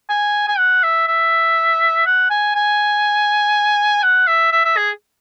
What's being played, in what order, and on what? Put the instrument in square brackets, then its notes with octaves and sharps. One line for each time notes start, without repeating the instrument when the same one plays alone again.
[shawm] G#5
G#5
F#5
E5
E5
F#5
G#5
G#5
F#5
E5
E5
E5
G#4